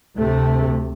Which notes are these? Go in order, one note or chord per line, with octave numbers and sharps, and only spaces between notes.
D2 C3 A3